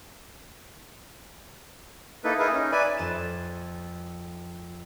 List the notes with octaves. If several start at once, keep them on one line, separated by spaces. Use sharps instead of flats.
A#3 D#4 E4 A4 B4
D#4 E4 G#4 A#4 B4 E5
C#4 D#4
B4 D5 E5 G#5 B5
F2 A6 E7